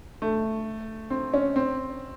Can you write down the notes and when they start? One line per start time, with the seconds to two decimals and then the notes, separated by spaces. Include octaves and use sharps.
0.22 A3
1.10 C4
1.34 C#4
1.56 C4